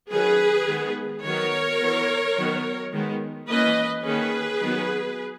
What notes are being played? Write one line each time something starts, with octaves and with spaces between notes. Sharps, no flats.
D#3 F#3 C#4 G#4 B4
D#3 G#3 B3
D#3 F#3 B3 A#4 C#5
E3 B3
D#3 F#3 B3
D#3 G#3 B3
E3 A#3 C#4 B4 D#5
D#3 A#3 C#4 G#4 B4
D#3 F#3 B3